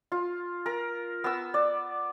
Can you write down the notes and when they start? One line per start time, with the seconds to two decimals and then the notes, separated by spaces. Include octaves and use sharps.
0.12 F4
0.66 A#4
1.24 B3 E6
1.54 D5